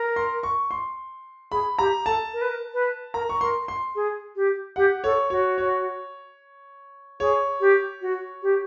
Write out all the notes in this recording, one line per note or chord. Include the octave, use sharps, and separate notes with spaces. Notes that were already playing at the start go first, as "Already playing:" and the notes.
Already playing: A#4
C6
C#6
C6
G#4 B5
G4 A#5
A4 A5
A#4
B4
A#4
B4
A#4 A#5
C#6
A#4 C6
C6
G#4
G4
G4 F#5
A4 C#5
F#4 C#5
C#5
G#4 C#5
G4
F#4
G4